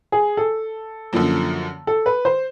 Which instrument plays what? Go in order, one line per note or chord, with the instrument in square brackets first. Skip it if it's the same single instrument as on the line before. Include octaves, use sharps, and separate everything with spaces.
[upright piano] G#4
A4
[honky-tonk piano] F#2 D3 F3 A#3
[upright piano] A4
B4
C5